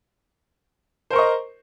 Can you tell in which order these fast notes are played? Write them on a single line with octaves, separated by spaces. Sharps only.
C5 A#4 C#6 D#5